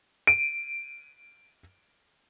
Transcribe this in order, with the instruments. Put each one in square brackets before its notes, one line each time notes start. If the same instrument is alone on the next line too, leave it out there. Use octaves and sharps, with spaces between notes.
[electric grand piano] D7 D#7